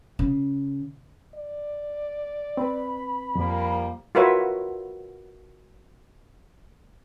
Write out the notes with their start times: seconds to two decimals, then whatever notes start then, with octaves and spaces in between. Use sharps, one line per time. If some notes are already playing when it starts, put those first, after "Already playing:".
0.19 C#3
1.35 D5
2.57 C4 B4 B5
3.35 F2 F3 G3 A#3
4.15 F4 F#4 A#4 B4 C#5 E5